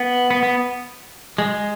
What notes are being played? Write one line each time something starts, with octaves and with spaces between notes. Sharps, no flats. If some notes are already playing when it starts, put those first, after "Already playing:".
Already playing: B3
B3
B3
G#3